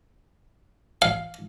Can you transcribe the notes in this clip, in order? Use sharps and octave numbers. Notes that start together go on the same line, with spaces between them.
F5